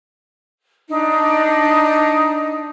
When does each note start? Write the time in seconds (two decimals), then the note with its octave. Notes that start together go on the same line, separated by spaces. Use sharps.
0.89 D4 D#4